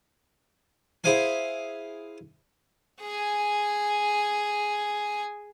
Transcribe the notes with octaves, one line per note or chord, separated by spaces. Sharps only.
E4 G#4 C5 F5 G#5
G#4 G#5